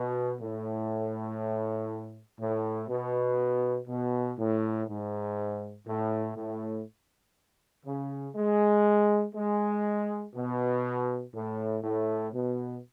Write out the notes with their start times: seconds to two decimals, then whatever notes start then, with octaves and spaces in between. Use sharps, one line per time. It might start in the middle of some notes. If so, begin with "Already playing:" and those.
Already playing: B2
0.41 A2
2.39 A2
2.89 B2
3.88 B2
4.38 A2
4.88 G#2
5.87 A2
6.37 A2
7.86 C#3
8.36 G#3
9.35 G#3
10.35 B2
11.34 A2
11.83 A2
12.33 B2